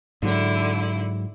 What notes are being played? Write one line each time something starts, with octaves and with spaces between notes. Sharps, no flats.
G#2 D3 F#3 E4